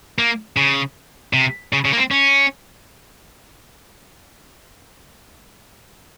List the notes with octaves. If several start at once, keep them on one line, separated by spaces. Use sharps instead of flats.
A#3
C#3
C3
C#3
C#3
A#3
C4
C#4